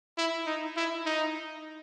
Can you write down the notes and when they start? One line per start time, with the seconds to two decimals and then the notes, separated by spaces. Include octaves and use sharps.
0.18 E4
0.46 D#4
0.76 E4
1.06 D#4